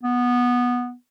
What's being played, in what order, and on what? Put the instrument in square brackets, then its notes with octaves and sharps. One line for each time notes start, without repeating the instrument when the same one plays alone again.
[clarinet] B3